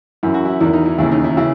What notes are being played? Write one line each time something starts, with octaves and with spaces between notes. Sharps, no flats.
F#2 E3 E4
F#4
E4
E2 D#3 E4
D#4
E4
D#2 C#3 E3 E4
D#4
E4
C#3 E3 E4